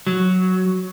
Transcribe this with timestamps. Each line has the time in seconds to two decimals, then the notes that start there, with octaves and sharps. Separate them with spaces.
0.07 F#3